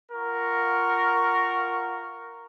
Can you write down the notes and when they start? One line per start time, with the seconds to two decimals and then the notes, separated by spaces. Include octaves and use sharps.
0.11 F4 A#4 F#5 C#6